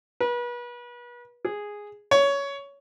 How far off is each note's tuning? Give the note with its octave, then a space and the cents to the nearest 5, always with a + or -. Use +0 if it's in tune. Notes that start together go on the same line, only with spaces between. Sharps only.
B4 -35
G#4 -5
C#5 +15